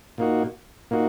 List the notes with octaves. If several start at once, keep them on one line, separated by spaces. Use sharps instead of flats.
A#2 A#3 D#4 F#4
A#2 A#3 D#4 F#4